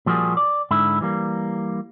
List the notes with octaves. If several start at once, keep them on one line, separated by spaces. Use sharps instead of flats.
A#2 F3 G3 A#3 F#4 G#4
D5
G#2 D3 E4
E3 G3 A#3